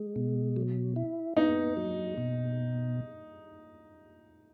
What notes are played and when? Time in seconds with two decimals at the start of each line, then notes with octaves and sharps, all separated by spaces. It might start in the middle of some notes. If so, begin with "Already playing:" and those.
Already playing: G#3
0.16 B2
0.56 F#3
0.96 E4
1.36 B3 D#4
1.77 F#3
2.18 B2